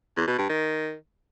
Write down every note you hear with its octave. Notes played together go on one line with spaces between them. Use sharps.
E2
B2
G2
D#3